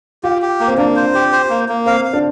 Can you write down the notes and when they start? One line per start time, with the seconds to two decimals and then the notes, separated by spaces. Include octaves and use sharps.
0.23 F4 G4
0.42 G4
0.60 A#3
0.67 C4
0.78 A#3 D4
0.96 C5
1.14 G4
1.32 C5
1.50 A#3
1.69 A#3
1.86 C4 F5
2.05 F5
2.13 D4